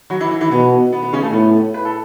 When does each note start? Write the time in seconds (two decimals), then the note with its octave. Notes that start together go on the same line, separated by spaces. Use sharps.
0.10 F#3 F#4
0.20 E3 E4
0.31 E3 E4
0.41 E3 E4
0.51 B2 B3
0.92 B3
1.03 B3
1.13 C#3 C#4
1.22 A3 A4
1.33 A2 B3
1.74 B4
1.85 A4